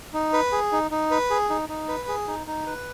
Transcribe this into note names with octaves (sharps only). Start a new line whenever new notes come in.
D#4
B4
G#4
D#4
D#4
B4
G#4
D#4
D#4
B4
G#4
D#4
D#4
B4